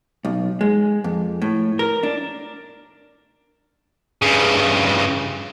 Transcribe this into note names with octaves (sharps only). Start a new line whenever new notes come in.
B1
G#3
F2
A2
A#4
D4
G2 C#3